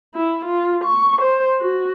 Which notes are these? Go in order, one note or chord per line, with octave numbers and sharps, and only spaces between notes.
E4
F4
C#6
C5
F#4